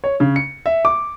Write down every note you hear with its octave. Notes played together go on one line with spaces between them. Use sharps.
C#5
C#3
C#7
E5
D6